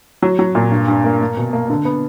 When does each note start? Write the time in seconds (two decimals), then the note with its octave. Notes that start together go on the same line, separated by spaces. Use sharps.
0.22 F#3
0.39 F#3
0.55 A#2
0.72 G2
0.88 G2
1.04 A#3
1.21 A#3
1.37 B2
1.53 A#3
1.70 D3
1.85 B3